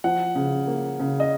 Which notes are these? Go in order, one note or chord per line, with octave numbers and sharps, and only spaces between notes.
F3 F#5
C#3
A#3
C#3
D#5